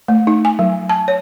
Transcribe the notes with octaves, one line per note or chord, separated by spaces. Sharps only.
A3
D#4
G#5
F#3
A5
C#5